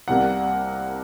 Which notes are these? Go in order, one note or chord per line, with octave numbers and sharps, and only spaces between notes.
C2 C3 G3 A#3 F#5